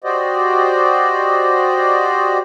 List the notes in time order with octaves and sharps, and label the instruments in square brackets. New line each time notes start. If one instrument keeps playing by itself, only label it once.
[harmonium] F#4 G4 C5 D5 D#5